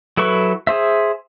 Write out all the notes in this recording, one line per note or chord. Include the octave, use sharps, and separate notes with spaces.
F#3 E4 A4 B4 C#6
G#4 C5 E5